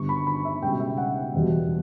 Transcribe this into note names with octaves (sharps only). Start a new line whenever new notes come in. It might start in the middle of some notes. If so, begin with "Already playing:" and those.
Already playing: G1 G2 D3 G3 C#6
B5
B5
E5
C#2 B2 G3 G5
E5
F#5
E1 E2 B2 G3